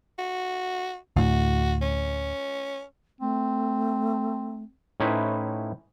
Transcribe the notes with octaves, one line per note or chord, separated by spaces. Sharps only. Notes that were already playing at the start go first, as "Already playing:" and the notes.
F#4
D2 A2 F#4
C#4
A3 C4
A2 C#4 D#4 E4 B4 C5